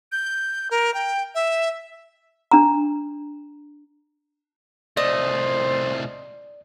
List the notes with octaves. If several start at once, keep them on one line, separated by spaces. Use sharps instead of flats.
G6
A#4
G5
E5
D4 A#5
C2 A3 C5 D5 D#5